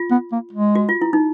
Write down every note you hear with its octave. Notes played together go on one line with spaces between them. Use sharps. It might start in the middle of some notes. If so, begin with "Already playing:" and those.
Already playing: F4
B3
A#3
G#3
F#4
F4
E4
D#4